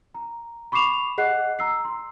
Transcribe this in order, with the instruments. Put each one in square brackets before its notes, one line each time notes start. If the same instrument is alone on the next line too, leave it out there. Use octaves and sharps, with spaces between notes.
[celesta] A#5
B5 C#6 D6 C7 E7 F7
G#4 D#5 F#5 F#6 C7
A#5 E6 C7
C6